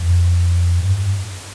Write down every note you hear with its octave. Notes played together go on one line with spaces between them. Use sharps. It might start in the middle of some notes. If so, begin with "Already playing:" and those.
Already playing: F2
G2